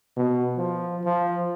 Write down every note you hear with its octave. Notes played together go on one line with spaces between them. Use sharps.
B2
F3
F3